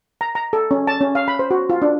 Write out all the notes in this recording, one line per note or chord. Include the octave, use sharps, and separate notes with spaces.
A#5
A#5
A4
C#4
A5
C#4
F5
B5
C5
F#4
F4
D4